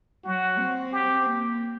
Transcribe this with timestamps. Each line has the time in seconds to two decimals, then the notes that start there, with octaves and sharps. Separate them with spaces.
0.24 F#3 F#4
0.58 C4
0.92 G4
1.27 A#3